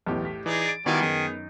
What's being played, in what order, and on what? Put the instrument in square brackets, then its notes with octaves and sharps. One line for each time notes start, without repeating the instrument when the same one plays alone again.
[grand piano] B1 E2 E3 [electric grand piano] A2 G4
[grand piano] B6
[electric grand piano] E3 [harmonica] D#4 G#4 D5
[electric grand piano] A6 D7
[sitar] D#3 [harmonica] G3 D5 G#5 [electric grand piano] B3 [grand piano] D#4 E4 F#4
[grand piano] F#2 [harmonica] G#4